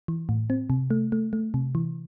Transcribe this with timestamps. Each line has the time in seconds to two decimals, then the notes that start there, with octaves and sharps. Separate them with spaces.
0.08 E3
0.29 A2
0.50 C4
0.70 C3
0.91 A3
1.12 A3
1.33 A3
1.54 C3
1.75 E3